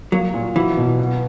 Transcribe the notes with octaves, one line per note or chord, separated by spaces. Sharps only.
F#3 A#3
A#2
E3 F#3
B2
B3